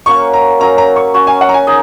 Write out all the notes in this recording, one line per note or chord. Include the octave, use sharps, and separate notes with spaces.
A#3 C#4 F#4 C#6
A#5
F#3 C#4 A#4 A#5
A#5
C#6
C#4 F#4 C#5
G#5
F#5
A#5
G#5
D#4 G#4 D#5